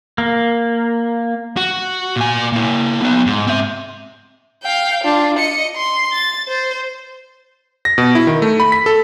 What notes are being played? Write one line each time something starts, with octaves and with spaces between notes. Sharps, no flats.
A#3
F#4
A#2 G#5
A#3 E4
B3 D#4
G#2
C4 E5
F5 G5
D4 F4
D#5 C#7
C6
A6
C5
A#6
B2
E4
D#3
A3
B5
B6
A4